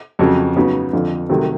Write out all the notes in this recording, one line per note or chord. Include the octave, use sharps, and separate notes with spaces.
F2 C#3 F#3
C#3 F#3 B3 D#4
F2 D3 F3
C2 C3 D#3 F#3 A3